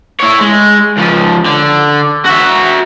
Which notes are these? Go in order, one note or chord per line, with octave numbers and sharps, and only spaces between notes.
E4 C#5
G#3
C#2 F3
D3
F#4 E5